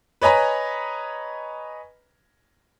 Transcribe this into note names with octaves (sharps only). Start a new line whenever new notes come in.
B4 C#5 D#5 G#5 A#5 B5